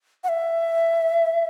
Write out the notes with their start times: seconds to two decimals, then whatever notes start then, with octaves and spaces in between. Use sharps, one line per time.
0.24 F#5
0.29 E5